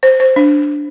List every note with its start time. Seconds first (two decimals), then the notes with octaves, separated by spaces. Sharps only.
0.03 C5
0.20 C5
0.36 D4